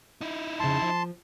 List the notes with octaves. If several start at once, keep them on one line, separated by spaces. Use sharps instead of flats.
D#4 E4
F2 A#2 C#3 A5 C6
F3